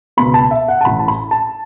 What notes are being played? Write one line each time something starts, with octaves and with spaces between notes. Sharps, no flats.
C#2 B2 B3 B5
A5
E5
F#5
A5
A1 A2 E3 B5
A5
B5
A5